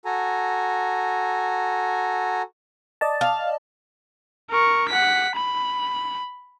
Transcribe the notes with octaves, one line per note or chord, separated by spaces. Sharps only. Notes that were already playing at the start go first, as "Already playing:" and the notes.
F#4 A4 G#5 A#5
D5 D#5 A5
F5
A#4 C#6
F#5 B6
B5